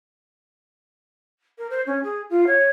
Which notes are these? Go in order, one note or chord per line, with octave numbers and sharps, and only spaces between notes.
A#4
C5
C#4
G#4
F4
C#5